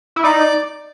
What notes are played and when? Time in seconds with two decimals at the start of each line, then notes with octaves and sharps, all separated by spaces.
0.16 E4
0.24 D#4 D5